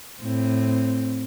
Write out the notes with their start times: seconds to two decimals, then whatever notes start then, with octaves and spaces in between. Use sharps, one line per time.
0.21 A2 C4